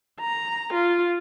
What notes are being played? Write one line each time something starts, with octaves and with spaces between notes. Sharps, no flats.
A#5
F4